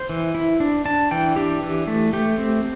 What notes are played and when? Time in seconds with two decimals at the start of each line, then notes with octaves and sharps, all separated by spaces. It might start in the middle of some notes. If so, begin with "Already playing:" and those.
Already playing: C5
0.09 E3
0.35 E4
0.60 D4
0.85 D4 A5
1.11 E3 G5
1.36 D4 G4
1.63 E3
1.87 A3
2.13 A3 G4
2.38 C4